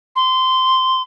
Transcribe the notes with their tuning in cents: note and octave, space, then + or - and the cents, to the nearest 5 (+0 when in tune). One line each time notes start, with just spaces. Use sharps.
C6 -15